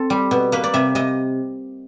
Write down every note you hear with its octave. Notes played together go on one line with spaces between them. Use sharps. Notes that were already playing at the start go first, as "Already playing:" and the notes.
Already playing: C4 A4
G3
B2
A#3 B4
D5
C3 E5
C3 D#5